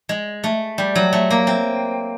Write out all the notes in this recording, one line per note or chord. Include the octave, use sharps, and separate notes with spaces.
G#3
A3
G3
F#3
A3
A#3
C4